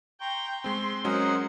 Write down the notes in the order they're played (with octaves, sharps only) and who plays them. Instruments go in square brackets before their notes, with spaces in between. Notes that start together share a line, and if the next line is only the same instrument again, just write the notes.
[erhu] G5 [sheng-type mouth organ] A#5 C6 C#6
[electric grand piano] G#3 C4 [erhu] C6 [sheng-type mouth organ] C#6
[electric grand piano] F#3 G#3 C#4 [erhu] A#4 [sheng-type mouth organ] C5 D#5 F#5